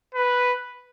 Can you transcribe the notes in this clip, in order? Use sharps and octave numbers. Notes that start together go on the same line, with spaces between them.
B4